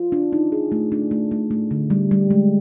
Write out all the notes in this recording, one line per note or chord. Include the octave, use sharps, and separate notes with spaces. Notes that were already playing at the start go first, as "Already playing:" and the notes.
Already playing: F4
D4
D#4
G#4
A3
D4
A3
A3
A3
D3
G3
G3
G#3